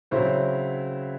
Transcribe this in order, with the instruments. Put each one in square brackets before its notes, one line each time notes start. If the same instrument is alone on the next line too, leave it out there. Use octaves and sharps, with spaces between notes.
[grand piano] C#3 F#3 C4 E4 C5